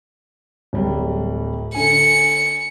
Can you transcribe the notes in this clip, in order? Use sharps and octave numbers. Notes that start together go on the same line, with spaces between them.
D1 F#3 G3
D3 G#5 C#7